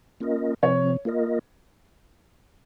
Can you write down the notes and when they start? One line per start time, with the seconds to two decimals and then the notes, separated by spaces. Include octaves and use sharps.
0.20 A#3 C#4 F4 A#4 D#5
0.63 C3 F3 C4 C#5
1.05 A#3 F4 A#4 D#5